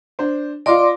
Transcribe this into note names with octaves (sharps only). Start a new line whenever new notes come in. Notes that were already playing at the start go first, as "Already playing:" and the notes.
D4 C5
F4 D5 D#5 C6 D6